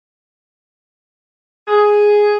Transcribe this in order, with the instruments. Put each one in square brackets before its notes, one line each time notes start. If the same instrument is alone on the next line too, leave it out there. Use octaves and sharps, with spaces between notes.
[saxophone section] G#4